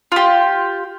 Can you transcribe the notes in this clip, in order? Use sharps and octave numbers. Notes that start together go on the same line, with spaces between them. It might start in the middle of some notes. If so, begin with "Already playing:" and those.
F4 G4